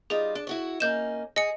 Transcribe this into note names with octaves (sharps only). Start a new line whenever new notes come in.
G3 D#4 F4 G#4
D4
E4 F#4 C#5
A#3 C#4 D#4 G6 E7
G#4 D#5 C#7